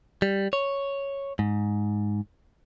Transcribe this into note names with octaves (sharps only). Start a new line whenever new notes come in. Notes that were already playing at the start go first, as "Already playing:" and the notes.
G3
C#5
G#2